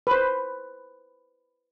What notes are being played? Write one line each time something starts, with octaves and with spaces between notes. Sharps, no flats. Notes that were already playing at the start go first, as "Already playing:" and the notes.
B4 C5